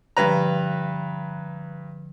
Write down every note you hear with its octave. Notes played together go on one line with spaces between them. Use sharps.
G2 D3 F3 B4 A#5